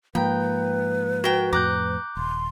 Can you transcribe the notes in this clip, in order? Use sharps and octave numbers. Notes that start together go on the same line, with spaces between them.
G#2 F3 A#3 B4 G5 A#5 G6
F#4 A#4 G5
F2 A2 A#5 D6 F#6 G6
D#1 C6